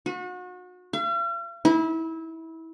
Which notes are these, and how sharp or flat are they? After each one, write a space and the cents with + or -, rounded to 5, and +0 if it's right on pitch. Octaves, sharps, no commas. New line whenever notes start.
F#4 -35
F5 -45
E4 -25